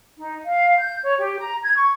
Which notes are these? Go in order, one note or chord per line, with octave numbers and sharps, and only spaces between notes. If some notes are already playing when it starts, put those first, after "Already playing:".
D#4
F5
G6
C#5
G4
A#5
G#6
C#6